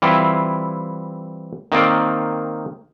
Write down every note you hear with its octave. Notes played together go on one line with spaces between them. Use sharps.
E3 G3 C4 E4 F4
D#3 A#3 C4 D5